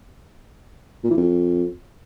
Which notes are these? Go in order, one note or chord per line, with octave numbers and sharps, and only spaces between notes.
A#2
E3
F2